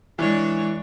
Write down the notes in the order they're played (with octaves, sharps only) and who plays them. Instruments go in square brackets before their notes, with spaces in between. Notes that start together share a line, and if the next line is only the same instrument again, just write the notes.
[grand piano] E3 [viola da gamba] G#3 D4 C#5